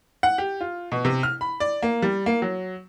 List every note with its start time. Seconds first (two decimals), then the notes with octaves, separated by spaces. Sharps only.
0.23 F#5
0.38 G4
0.61 F4
0.92 B2
1.05 C3
1.23 F6
1.41 B5
1.60 D5
1.82 A#3
2.02 G3
2.26 A#3
2.42 F#3